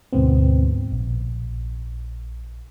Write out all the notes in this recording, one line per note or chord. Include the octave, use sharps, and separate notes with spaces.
D2 G#2 B2 B3 C4
A#1